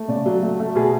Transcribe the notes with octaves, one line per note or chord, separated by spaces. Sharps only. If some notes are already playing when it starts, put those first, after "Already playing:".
Already playing: A3
C#3 D5
F#3
A3
A3
B2 G#4